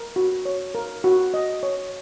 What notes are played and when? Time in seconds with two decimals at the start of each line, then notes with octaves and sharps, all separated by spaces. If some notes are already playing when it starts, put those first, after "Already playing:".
Already playing: A#4
0.16 F#4
0.45 C#5
0.75 A#4
1.04 F#4
1.34 D#5
1.63 C#5